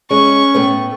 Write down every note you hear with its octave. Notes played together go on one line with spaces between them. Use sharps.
G#3 C#4 C#6
A2 A3 B3